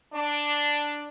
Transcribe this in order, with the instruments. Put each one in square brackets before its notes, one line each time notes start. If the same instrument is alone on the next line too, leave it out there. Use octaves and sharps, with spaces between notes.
[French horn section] D4